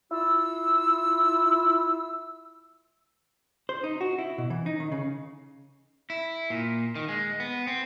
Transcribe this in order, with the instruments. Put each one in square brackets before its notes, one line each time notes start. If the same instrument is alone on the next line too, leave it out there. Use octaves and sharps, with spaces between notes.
[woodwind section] E4 F4 E6
[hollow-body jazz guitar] C5
D#4
F#4
E4
B2
E3
D#4
D#3
C#3
[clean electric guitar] E4
A#2
D#3
G#3
B3
C4